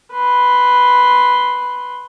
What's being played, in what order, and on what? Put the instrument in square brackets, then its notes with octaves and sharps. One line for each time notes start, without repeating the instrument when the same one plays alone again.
[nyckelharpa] B4 C6